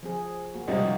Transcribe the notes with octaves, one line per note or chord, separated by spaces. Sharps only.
F3 C4 G#4
A#3 F#4
C#2 C3 G3 D#4 F4 D#5
F3 F#4